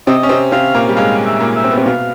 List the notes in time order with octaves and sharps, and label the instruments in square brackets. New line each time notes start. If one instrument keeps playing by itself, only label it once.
[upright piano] C3 C4 [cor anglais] D#5
[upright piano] C#4
C3 C4
[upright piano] C3 C4 [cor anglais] F5
[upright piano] A#2 A#3
G3
[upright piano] G#2 G#3 [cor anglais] F5
[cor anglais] E5
[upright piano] A#2 A#3
[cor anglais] E5
[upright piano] C4
B3
C3 C4
[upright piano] B2 B3 [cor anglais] F5